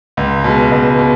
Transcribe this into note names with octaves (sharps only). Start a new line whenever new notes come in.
C#2
B2 G#3
C#2
B2